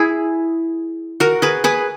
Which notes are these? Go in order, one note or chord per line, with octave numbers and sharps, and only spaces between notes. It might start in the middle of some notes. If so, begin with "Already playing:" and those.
Already playing: E4 G#4
F#4 A#4
G#4 B4
G#4 B4